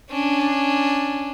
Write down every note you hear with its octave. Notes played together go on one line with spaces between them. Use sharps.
C#4 D4